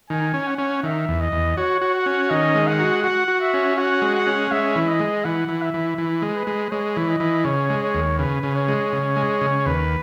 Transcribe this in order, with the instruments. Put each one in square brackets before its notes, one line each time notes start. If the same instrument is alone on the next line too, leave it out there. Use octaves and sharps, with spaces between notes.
[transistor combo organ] D#3 [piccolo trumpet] G#5
[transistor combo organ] C#4
[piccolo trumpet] F#5
[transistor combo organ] C#4
[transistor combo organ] D#3 [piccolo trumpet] E5
[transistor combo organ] E2
[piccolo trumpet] D#5
[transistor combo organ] E2
[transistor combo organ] F#4 [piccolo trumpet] C#5
[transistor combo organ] F#4
[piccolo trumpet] F#5
[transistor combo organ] C#4
[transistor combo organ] D#3 [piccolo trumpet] D#5
[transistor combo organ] G#3
[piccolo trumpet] F#5
[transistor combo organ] F#4
[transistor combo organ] F#4 [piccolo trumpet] F#5
[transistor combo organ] F#4
[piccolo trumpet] E5
[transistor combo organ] C#4
[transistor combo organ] F#4 [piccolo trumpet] F#5
[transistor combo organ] G#3
[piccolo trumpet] F#5
[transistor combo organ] C#4
[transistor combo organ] G#3 [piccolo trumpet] E5
[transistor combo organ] E3
[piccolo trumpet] D#5
[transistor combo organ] G#3
[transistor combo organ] E3 [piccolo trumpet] F#5
[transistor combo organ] E3
[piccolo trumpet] E5
[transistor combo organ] E3
E3
G#3
[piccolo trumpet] B4
[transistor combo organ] G#3
[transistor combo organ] G#3 [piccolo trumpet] C#5
[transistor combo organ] E3
[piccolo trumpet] D#5
[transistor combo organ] E3
[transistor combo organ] C#3 [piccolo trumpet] C#5
[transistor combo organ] G#3
[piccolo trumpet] C#5
[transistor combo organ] D#2
[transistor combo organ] C#3 [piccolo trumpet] B4
[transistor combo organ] C#3
[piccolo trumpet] C#5
[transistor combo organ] G#3
C#3
G#3
C#3
[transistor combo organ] D#2 [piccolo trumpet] B4